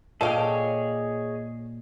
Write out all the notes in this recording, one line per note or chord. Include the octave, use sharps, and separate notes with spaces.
A#2 G#4 A4 C#5 D#5 F5 G5